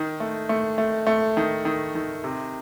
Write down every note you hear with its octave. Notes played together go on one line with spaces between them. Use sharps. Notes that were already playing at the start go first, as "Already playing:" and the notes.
Already playing: D#3
A3
A3
A3
A3
D#3
D#3
D#3
C3